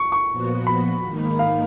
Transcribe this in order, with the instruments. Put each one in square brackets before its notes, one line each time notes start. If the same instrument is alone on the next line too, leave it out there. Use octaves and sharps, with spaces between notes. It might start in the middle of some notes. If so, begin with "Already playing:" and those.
Already playing: [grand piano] C#6
C#6
[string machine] A#2 F3 B3 F#4
[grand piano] B5
[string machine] G#2 D#3 A#3 D#4
[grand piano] F5